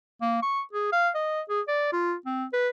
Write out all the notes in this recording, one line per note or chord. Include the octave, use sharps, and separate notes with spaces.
A#3
C#6
G#4
F5
D#5
G#4
D5
F4
C4
B4